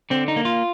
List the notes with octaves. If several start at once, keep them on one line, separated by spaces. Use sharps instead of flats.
D3 C4
D#4
A#3
F4